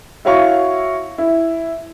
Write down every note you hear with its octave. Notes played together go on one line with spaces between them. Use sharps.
E4 F#4 C#5 F5 C#6
E4